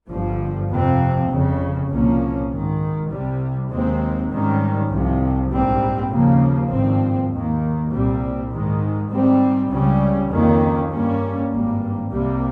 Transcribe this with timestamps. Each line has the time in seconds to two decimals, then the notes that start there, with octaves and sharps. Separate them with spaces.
0.09 G1 G2 F3
0.70 F2 C3 F3 C4
1.29 G1 F2 C#3
1.89 C2 A#2 F3 A#3 C#4
2.51 G#1 G#2 D#3
3.10 C2 C3 G3
3.70 D#2 D#3 G#3 C4
4.30 G#2 D#3 G3 C#4
4.90 C2 C3 F3
5.50 A#1 G#2 G3 C4
6.10 D#2 C#3 F3 A#3
6.70 G#1 G2 F3 C4
7.31 D#2 D#3 A#3
7.90 C2 A#2 G3 C4
8.51 G#2 D#3 G#3
9.11 G#2 G3 C4
9.70 C#2 C#3 G3 C#4
10.30 F2 D#3 A#3 C#4
10.91 G2 G3 A#3 C#4
11.51 G#1 G2 G3 A#3
12.11 C2 C3 G3 A#3